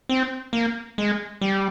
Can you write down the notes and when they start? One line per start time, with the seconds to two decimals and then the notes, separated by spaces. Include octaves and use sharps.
0.09 C4
0.53 A#3
0.98 G#3
1.41 G3